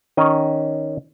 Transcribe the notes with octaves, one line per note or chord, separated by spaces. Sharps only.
D#3 C#4 D#5